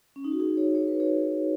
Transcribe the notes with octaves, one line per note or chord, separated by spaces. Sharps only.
C#4
D#4
F#4
D#4 G#4
G#4 C#5
C#5
B4
G#4 C#5